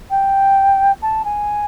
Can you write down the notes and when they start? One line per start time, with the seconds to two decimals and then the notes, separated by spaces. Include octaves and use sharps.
0.10 G5
1.02 A5
1.25 G#5